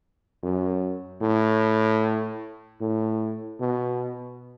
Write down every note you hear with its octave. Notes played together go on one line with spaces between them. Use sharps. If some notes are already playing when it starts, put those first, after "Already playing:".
F#2
A2
A2
B2